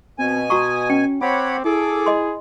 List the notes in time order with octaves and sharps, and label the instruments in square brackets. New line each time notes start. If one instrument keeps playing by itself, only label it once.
[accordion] B2 G#5 [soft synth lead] C4
[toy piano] F#4 A#5 C#6 [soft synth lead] D#6
[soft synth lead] C#4 [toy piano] G5
[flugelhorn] C4 [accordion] C#5 F#5 B5 [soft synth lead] D6
[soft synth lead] E4 [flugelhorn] G#4 [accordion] A4 D6
[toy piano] D#5 C6